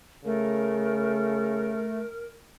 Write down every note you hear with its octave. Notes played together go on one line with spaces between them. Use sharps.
C#3 A3 A#4